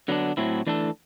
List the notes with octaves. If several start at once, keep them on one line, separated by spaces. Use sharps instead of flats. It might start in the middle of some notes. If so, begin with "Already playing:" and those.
D3 F#3 B3 D4
A2 F#3 A3 C4 E4
E3 A3 D4 A4